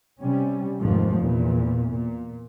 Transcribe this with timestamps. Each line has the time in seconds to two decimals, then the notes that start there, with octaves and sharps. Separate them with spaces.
0.20 C3 G3 C#4
0.81 F1 D#2 G#2 F3
1.18 E2 A#2
1.93 A#2